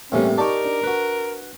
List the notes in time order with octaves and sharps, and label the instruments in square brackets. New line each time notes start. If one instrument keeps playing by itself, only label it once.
[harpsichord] A2 C3 E3 [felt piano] G3 A#3 C4 [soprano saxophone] C#4
[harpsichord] D#4 G4 D5 [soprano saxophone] A#4 [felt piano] A5 C#6
[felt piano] D4
[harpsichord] F#4 B4